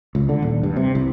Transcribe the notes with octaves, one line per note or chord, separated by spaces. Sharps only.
C#2
D3
D#1
G2
C3
C2